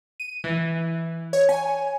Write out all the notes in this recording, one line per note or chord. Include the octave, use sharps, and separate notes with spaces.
D#7
E3
C#5
G#5